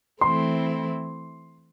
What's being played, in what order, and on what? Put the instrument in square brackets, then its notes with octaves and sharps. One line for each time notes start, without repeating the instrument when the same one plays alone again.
[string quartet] E3 A3 C4 E4 [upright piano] C6